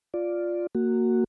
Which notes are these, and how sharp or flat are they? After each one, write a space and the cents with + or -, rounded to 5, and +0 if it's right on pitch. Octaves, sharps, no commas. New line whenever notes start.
F4 +0 D5 +0
A#3 -15 F#4 +0